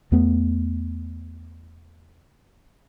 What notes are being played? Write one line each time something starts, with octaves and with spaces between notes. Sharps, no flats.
E2 A3 B3